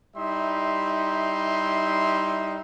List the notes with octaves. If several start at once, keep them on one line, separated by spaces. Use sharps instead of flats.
G3 D#4 E4 E5 C6